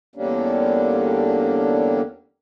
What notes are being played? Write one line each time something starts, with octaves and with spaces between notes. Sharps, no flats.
E2 D3 G3 A#3 C#4 D4